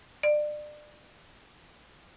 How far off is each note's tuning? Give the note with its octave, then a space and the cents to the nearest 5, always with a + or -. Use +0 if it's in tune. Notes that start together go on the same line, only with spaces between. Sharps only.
D5 +30